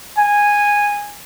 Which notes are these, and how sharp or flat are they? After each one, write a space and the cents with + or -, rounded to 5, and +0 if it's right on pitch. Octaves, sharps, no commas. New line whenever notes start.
G#5 -10